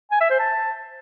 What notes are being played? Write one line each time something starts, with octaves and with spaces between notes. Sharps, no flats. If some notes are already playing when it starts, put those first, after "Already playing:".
G#5
E5
C5
A5